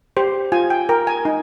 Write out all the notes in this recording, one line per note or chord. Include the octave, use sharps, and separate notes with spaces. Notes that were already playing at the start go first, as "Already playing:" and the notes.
G4 C5
F4 G#5
G5
A#4 G5
G#5
D#4